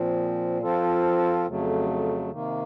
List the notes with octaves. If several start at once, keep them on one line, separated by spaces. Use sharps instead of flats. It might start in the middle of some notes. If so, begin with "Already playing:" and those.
Already playing: A#2 F3 C4
F3 C4 F4 A4
F2 C#3 F#3 A3
C3 D#3 A#3